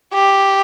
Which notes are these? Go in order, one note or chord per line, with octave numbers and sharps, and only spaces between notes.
G4